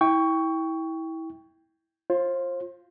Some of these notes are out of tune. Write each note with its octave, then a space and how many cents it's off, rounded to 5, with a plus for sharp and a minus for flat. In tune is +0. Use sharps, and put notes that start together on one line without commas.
E4 -25 G5 +10 C#6 +15
F4 +0 C5 +35